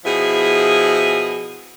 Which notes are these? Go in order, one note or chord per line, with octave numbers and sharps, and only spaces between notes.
B2 F3 E4 G#4